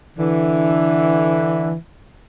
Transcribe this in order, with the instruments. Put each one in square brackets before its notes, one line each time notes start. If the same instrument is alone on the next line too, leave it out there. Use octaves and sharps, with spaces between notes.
[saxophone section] D3 E3